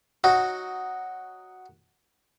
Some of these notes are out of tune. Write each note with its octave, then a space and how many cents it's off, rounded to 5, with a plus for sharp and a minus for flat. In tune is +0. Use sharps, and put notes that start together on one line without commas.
F#3 +0 D#4 +0 F#4 +0